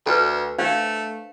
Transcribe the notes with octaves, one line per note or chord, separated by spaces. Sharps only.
D2 A4 B4
A3 D4 C5 F5